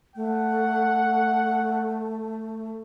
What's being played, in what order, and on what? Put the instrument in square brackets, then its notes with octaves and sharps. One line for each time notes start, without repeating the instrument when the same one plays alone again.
[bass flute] A3 [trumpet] F#5